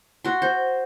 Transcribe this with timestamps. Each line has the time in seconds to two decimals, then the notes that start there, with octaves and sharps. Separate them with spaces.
0.25 F#4 C6
0.42 C5